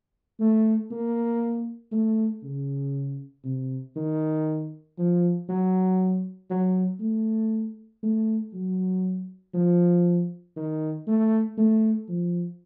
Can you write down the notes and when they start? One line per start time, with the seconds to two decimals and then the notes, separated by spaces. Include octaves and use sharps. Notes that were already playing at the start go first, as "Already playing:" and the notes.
0.40 A3
0.91 A#3
1.92 A3
2.43 C#3
3.44 C3
3.96 D#3
4.98 F3
5.49 F#3
6.50 F#3
7.00 A3
8.03 A3
8.54 F#3
9.54 F3
10.56 D#3
11.07 A3
11.58 A3
12.09 F3